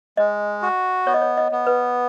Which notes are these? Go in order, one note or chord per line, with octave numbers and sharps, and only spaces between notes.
G#3 D#5
F#4
B3 C#5
D#5
C#5
D#5
B3
B4